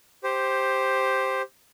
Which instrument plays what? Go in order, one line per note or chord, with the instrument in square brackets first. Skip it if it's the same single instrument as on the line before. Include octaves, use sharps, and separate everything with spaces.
[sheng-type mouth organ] G4 C5